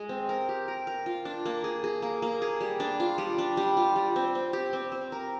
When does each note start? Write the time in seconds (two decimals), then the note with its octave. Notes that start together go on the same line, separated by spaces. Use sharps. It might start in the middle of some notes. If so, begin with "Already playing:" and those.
Already playing: G#3
0.09 C4
0.29 A#4
0.49 G4
0.68 A#4
0.87 A#4
1.06 F4
1.25 D4
1.46 A#3
1.64 G#4
1.84 G#4
2.02 A#3
2.22 A#3
2.42 G#4
2.61 G3
2.80 D4
3.00 F4
3.18 G3
3.38 D4
3.57 G3
3.77 F4
3.96 G3
4.16 C4
4.35 C4
4.53 G4
4.73 C4
4.92 C4
5.12 A#4